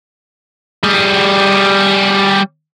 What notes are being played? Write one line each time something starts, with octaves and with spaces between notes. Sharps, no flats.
G3 G#4